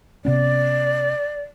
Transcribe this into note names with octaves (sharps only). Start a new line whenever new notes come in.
C3 B3 C#4 D5